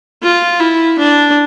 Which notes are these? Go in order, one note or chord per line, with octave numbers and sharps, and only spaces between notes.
F4
E4
D4